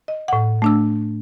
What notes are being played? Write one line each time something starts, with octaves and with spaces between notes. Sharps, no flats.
D#5
A2 F#5
A3 D4 E6